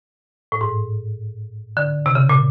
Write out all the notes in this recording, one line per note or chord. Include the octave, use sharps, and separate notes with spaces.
A2
G#2
D3
C3
C#3
A#2